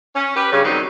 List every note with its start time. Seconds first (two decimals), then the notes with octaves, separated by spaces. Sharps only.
0.15 C#4
0.35 G4 B4
0.52 G2 C#3
0.64 D#3 F#3 G3 C4 D#4